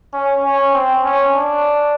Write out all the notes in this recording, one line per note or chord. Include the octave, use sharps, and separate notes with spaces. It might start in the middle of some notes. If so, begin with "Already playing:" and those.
C#4
C#4
C4
C#4
D4